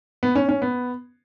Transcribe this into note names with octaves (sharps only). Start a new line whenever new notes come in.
B3
C#4
C#4
B3